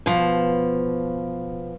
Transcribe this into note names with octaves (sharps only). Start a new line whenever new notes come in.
B2 F3